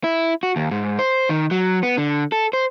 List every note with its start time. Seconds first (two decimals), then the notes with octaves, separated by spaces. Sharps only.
0.04 E4
0.43 F#4
0.56 D#2
0.71 G#2
0.99 C5
1.29 D#3
1.51 F#3
1.83 B3
1.97 D3
2.32 A4
2.53 C5